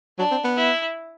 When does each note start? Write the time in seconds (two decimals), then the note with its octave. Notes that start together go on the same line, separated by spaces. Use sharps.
0.18 F#3 D4
0.31 C4
0.44 B3
0.57 E4